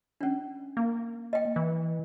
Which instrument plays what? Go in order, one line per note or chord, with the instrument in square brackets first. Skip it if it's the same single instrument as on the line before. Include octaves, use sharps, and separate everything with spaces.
[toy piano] C#4 D4
[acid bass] A#3
[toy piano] D#5 G5
[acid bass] E3